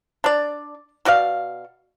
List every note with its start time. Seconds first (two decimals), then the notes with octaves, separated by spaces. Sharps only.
0.24 D4 D5
1.05 B2 F#4 D5 F5